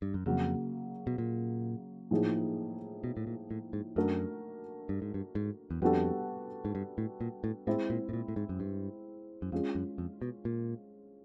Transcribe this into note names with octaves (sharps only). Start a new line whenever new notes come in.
G2
F#2
F2 C#3 F#3 A#3
B2
A#2
A2 F3 A#3 D#4 G#4
B2
A2
A#2
A2
G#2
F#2 A3 D4 F#4 A#4
G2
G#2
G2
G#2
E2
F2 G3 B3 D4 F#4 A4
G#2
G2
A2
A#2
A2
A2 G#3 C4 E4
A#2
A2
A#2
A2
G#2
F#2
G2
F#2
F2 G#3 C#4 F4
F#2
F2
B2
A#2